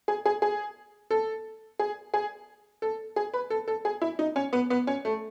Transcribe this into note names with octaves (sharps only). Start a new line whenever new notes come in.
G#4
G#4
G#4
A4
G#4
G#4
A4
G#4
B4
A4
A4
G#4
E4
D#4
C#4
B3
B3
C#4
A3